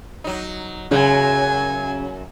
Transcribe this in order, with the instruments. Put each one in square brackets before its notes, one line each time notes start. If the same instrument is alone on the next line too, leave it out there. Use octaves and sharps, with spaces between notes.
[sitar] F#3 D#4
[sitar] F#2 F#3 [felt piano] C#3 [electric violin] G#5